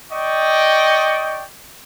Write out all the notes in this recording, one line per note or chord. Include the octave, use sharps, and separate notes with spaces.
D5 D#5 G5 C#6